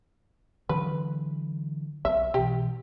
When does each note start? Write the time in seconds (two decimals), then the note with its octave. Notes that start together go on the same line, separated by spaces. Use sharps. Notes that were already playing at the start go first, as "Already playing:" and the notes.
0.69 D3 E3 F#3 B4
2.05 B1 E5
2.34 B2 E3 G4